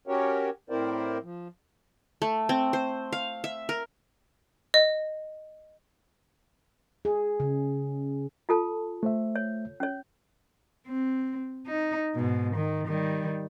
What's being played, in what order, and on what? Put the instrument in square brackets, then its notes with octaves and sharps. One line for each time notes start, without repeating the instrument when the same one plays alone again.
[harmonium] C#4 F#4 G4 A#4 C#5
A2 C4 E4 A#4 C5 D5
F3
[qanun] A3
C4
C5
F5
E5
A#4
[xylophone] D#5
[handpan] G#4
C#3
[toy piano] F4 A4 A5
[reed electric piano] A3 C5 E5
[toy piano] C#5
C#4 C#5
[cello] C4
D#4
G#2 B2
D#3
D#3 G3